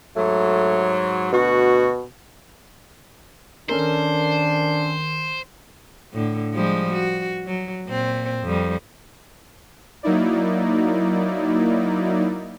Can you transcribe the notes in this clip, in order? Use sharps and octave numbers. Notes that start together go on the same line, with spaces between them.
G#2 F#3 A3
D2 B2 F#4
D#3 C#4 D4 A4 A#4 C5
A2 D3
F3 G3 G#3
F#4
F#3
A#2 C4
F2 G3
F#3 A#3 D#4 E4 D5